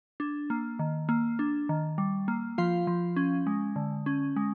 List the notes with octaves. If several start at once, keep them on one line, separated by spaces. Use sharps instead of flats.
D4
A#3
D#3
A#3
D4
D#3
G3
A#3
F3 F4 F5
F3
C#4
G#3
D3
C#4
G#3